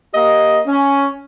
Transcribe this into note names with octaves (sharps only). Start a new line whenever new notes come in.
A#3 G4 D#5
C#4